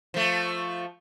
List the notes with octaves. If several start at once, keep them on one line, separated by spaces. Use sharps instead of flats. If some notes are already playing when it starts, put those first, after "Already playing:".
F3 A3